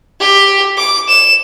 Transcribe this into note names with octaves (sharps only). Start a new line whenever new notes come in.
G4
D6
E7